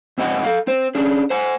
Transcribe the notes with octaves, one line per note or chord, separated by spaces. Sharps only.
G#2 C4 D#5 F#5 G#5
A4 F5
C4 C5
C#4 D4 G#4
C5 F#5 G#5